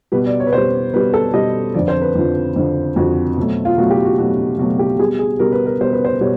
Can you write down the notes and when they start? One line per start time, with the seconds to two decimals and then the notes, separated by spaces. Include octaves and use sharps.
0.12 B2 G3 B4
0.26 D5
0.40 C#5
0.47 B4
0.53 B2 G3 C5
0.94 B2 G3 B4
1.14 A4
1.34 B2 G3 D#5
1.74 F2 D3 F3 D5
1.88 C5
2.02 B4
2.15 F2 D3 F3
2.56 F2 D3 F3
2.96 F2 D3 F3 F#4
3.37 B2 F#3 A3
3.65 F4
3.77 B2 F#3 A3 F#4
3.90 G4
4.05 F#4
4.18 B2 F#3 A3 F#4
4.58 B2 F#3 A3 F#4
4.79 G4
4.99 B2 G3 G#4
5.19 G#4
5.39 B2 G3 A#4
5.52 B4
5.65 A#4
5.80 B2 G3 C5
5.93 B4
6.05 C5
6.21 B2 G3 C#5